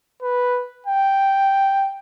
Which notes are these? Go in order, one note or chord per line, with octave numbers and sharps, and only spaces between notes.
B4
G5